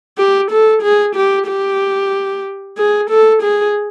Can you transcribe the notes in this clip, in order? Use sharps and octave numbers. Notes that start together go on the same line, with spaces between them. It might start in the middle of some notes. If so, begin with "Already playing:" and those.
G4
A4
G#4
G4
G4
G#4
A4
G#4